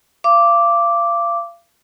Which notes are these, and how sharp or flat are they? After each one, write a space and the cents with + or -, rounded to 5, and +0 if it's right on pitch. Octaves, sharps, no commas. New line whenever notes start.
F5 -35 D6 -5